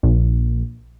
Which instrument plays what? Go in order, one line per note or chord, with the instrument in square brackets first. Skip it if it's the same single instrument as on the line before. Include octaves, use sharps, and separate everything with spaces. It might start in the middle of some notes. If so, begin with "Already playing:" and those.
[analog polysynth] A#1